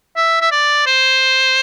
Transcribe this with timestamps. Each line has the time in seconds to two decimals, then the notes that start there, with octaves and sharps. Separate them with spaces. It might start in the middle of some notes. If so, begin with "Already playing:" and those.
0.16 E5
0.41 E5
0.51 D5
0.86 C5